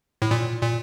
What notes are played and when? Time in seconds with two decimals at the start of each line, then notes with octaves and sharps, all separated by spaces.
0.22 A2
0.31 A#2
0.61 A#2